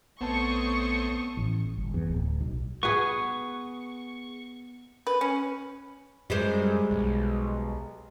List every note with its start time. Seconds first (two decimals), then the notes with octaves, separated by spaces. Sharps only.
0.21 A#1 A3 B3 C4 C#5 A5 C#6 D#6
1.37 A1
1.77 G1
1.94 E2
2.08 D1
2.41 B1
2.83 B3 G#4 C#6
5.07 B4
5.21 C#4
6.30 F#2 G3 G#3 C5
6.91 B1